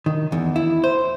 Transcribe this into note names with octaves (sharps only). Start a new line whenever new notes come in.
D#3
E2
E4
C5